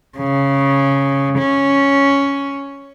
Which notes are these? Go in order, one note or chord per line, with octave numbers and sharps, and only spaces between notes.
C#3
C#4